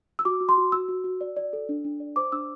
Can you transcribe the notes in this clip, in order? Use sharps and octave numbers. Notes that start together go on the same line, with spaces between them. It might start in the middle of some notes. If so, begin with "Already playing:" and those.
E6
F#4 D6
F#4
C6
F#4
F#4 E6
F#4
F#4
D5
D5
A4
D4
D4
D5
C5 D6
D4 E6